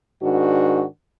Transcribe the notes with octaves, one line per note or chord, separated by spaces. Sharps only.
G#2 D#3 D4 F#4